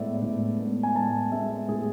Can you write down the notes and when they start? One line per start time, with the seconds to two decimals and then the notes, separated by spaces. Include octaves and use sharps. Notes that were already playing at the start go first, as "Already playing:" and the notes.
Already playing: A2 G#3 B3 D5 E5
0.22 A2
0.60 G#3 B3
0.83 G#5
0.95 A2 A5
1.32 G#3 B3 E5
1.68 A2 G#4